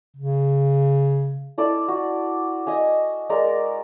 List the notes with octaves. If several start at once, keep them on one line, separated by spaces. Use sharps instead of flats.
C#3
E4 A4 D5
F#4
D#5 E5 G#5
G#3 A#4 D5 E5